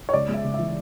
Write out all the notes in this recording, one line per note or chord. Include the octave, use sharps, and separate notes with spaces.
C#5
C#2 D5
G#3
E5
C#3
E5
E3